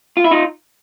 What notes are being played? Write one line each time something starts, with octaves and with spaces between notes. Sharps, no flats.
F4
E4
D#4 F4